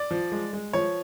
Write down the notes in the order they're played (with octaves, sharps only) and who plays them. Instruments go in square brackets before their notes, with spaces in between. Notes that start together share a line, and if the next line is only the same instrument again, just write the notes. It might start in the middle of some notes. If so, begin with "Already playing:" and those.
Already playing: [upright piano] D5
F3
G#3
G#3
F3 C#5